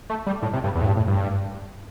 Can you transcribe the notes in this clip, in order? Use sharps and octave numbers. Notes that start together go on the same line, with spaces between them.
A3
G3
A2
C3
G2
E2
A2
G2
A2
G2